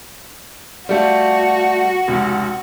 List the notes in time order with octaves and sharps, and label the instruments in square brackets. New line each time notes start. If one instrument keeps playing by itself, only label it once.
[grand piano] G3 A3 F4 [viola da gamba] F#4
[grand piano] F1 C#2